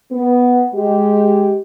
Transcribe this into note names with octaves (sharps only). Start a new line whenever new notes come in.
B3
G#3 G4